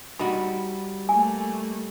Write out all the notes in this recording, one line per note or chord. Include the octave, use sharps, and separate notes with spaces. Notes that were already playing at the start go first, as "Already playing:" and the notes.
G3 D#4 F#4 B5
A3 A#3 G#5